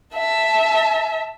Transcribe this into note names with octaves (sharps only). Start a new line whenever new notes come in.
E5 A5